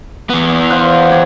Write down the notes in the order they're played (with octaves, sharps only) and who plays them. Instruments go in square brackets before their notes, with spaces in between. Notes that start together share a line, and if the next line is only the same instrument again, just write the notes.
[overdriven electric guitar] E2 B3
[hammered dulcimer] C5 F5 F#5
G4 C#5 D5